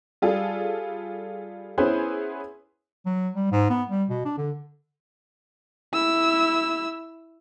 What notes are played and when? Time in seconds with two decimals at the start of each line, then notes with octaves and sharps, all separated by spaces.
0.22 G3 F4 G#4 A4
1.78 B3 C#4 E4 G#4 B4 C5
3.06 F#3
3.35 G3
3.52 G#2
3.70 B3
3.90 G3
4.09 B2
4.25 D4
4.37 D3
5.94 E4 E6